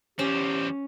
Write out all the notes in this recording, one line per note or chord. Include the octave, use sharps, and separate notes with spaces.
E2 C4 C#4 G4